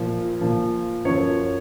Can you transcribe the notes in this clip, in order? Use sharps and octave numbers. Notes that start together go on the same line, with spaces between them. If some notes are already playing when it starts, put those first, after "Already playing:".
Already playing: A#2 F3
A#2 F3
F#2 F3 C#5